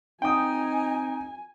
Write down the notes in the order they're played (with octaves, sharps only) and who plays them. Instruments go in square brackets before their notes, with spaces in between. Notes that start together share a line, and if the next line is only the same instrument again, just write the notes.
[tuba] C4 [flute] D#4 [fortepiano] G5 D#6 [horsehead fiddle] G#5